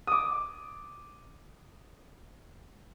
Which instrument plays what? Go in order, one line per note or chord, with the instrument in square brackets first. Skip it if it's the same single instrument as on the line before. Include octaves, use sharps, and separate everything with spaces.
[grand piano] D6 D#6